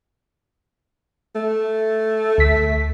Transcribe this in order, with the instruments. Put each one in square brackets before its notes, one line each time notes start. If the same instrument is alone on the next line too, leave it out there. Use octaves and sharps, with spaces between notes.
[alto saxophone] A3
[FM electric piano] D2 B6